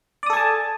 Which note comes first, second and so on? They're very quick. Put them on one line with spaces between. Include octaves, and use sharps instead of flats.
D5 D#6 A4 G#5 A5